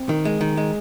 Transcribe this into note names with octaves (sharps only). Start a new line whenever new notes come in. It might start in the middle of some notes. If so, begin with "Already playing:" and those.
Already playing: C4
D#3
G#3
D#3
G#3